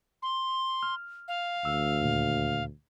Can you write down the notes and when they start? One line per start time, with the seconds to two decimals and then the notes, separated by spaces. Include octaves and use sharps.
0.22 C6
0.83 F6
1.28 F5
1.65 D2 E6
2.02 D#2 A#2